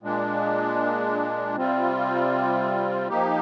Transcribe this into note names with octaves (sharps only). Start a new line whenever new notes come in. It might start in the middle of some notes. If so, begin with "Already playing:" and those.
A#2 G#3 D4
C3 G3 C4 F4
F3 A#3 D#4 G4